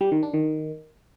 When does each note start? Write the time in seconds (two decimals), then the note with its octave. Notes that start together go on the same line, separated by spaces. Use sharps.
0.01 G3
0.12 D#3
0.23 D4
0.34 D#3